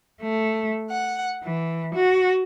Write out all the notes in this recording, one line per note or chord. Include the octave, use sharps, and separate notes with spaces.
A3
F#5
E3
F#4